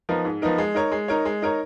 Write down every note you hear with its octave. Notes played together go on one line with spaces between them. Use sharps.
F3 B3 D#4 A#4
G#2
F3 B3 D#4 A#4
G#3
D#4 A#4 C#5
G#3
D#4 A#4 C#5
G#3
D#4 A#4 C#5